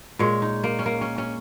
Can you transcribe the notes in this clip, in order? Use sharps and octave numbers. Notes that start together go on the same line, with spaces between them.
A#2 G#3 C#5
D#4
A#3
C#4
A#3
C#4
C#4